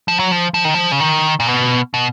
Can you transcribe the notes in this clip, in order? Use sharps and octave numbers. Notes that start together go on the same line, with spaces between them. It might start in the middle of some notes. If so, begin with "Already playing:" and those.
F3
F#3
F3
F3
D#3
F3
C#3
D#3
A#2
B2
B2